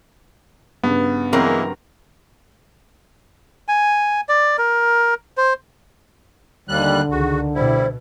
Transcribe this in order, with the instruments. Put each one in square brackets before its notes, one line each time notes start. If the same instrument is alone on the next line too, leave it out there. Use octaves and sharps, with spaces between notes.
[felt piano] G2 C#3 [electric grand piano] B3
[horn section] E3 G#3 A#3 [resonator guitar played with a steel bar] F#3 C4 A#4
[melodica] G#5
D5
A#4
C5
[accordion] D#2 G3 F#6 [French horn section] D3
[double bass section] C#2 D#3 [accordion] F#4 [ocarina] G#4
[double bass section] B2 [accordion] G3 E4 [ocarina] C5